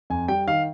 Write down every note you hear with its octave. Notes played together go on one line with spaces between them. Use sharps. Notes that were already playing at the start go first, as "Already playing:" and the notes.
F2 G#5
G3 G5
D#3 F5